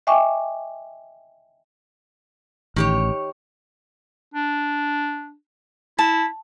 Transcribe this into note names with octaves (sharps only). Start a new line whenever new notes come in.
D#5 E5 G5 G#5 C#6 D6
A1 D#3 G4 C#5
D4
E4 A5